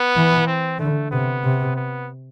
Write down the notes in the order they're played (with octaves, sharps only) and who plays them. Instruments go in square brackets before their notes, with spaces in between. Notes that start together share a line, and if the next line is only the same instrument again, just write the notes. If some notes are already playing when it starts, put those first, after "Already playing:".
Already playing: [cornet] B3
[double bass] E3
[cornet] C4
[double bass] D3 [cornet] A3
[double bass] C3 [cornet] B3
[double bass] C3
[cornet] B3